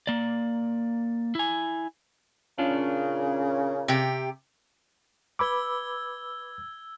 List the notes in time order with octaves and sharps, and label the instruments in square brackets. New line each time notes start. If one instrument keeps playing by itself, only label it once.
[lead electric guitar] A#3 D5
E4 G#5
[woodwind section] A#2 C#3 [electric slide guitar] C#4 D4 F4
[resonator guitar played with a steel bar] C3 G4
[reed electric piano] B4 B5 D6 [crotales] E6 G#6 G7